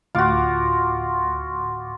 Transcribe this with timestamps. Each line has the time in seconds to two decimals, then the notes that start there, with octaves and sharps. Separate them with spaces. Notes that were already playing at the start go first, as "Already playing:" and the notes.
0.15 D2 A2 F4 F#4 D6